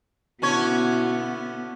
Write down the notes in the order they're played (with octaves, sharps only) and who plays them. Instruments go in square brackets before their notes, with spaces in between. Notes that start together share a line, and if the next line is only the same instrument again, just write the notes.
[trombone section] B2 E4 F#4 [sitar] D3 C#4 C#5 [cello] B3